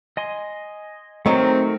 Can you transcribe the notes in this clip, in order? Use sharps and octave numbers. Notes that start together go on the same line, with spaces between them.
D#5 G#5 C6
D#3 F#3 A3 C4 D#4 A#4